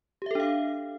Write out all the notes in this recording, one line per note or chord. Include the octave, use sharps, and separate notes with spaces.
D4 G4 A4 E5 F5